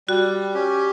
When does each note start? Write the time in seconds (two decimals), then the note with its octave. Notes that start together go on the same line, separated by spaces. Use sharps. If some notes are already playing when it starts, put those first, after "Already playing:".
0.08 G3 F#4
0.54 C#4 G4